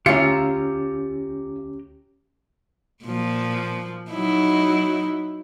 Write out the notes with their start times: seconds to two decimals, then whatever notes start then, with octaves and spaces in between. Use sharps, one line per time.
0.06 D2 C#4 E4 F4 G4 A#5 C#7
3.04 A#2 F3
4.11 F#3 D#4 E4